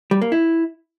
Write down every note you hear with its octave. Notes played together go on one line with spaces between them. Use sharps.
G3
A#3
E4